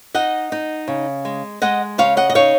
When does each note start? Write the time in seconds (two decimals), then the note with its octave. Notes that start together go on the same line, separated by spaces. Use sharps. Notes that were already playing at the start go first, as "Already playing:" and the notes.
0.15 D#4 D#5 F#5
0.52 D#4
0.88 C#3
1.25 G#3
1.62 G#3 D#5 F#5
1.98 C#3 C#5 F5
2.17 D#5 F#5
2.30 D#5
2.35 D#4 C#5 F5